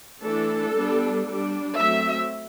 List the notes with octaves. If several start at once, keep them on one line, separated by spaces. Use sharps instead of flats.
E3 A3 D4 A4
G3 B3 D4
G3 D4
F#3 A3 C4 E5